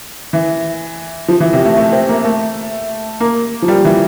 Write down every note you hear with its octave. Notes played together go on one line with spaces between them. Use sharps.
E3
F3
E3
C3
A3
A3
C4
A#3
A3
A#3
F3
G3
E3